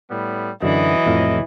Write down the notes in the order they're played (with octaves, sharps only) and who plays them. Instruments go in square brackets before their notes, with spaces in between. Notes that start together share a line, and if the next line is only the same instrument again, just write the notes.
[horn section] A2 G3 B3
[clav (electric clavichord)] F#2 D3 [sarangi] E3 [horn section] F#3 D#5
[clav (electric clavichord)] F2 A2 F5